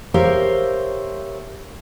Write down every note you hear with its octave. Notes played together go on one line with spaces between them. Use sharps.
G4 A#4 C5 C#5 E5 F5